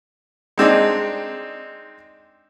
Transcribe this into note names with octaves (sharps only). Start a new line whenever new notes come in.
G#3 C4 D4 D#4